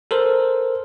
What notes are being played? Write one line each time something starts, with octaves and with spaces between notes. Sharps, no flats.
A4 A#4 C5